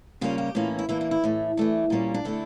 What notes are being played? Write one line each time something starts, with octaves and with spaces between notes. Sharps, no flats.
C#3 G3 A#3 C#4 F4
G4
A2 E3 A#3 C#4 F4
E4
E3 A#3 D4 E4
E4
E4
A2 E3 A3
E3 A3 D4
A#2 G3 A#3 C#4
D4
D3 A3 D4 E4